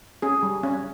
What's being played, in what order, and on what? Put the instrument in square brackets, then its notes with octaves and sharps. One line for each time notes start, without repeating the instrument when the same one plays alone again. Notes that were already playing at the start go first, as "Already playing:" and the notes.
[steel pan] C#4 G#4
G3
C#4